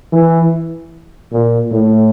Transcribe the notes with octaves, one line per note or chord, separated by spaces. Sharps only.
E3
A#2
A2